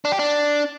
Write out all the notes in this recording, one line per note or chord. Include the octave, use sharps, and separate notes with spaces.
D4
G4
D4